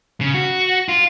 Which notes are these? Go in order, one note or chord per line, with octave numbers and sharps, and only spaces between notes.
C#3
F#4
F4